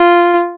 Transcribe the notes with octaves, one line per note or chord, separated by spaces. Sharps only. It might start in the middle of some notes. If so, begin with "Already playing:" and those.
Already playing: F4